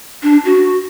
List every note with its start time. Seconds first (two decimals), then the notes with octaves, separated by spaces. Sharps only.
0.23 D4
0.45 F#4